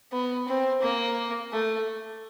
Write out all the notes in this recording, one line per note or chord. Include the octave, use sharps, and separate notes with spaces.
B3
C4
A#3
A3